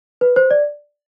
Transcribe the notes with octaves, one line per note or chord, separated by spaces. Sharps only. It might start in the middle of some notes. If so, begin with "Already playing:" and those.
B4
C5
D5